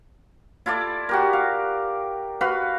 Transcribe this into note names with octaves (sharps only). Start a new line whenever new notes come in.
E4 F4 A4 D5
F#4 G4 A#4
F5
F#4 B4 F5